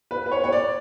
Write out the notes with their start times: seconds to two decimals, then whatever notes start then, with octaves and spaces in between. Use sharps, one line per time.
0.11 B4
0.26 B4
0.32 C#5
0.44 C#5
0.52 D5